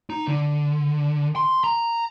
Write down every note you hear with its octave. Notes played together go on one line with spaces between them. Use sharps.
D#4
D3
C6
A#5